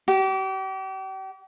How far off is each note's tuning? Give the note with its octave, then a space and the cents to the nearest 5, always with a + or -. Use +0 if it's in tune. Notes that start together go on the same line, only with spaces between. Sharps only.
G4 -40 D6 +5